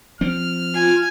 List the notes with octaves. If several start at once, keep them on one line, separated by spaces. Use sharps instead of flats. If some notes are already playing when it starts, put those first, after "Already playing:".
F3 C4 F6
F4 G#5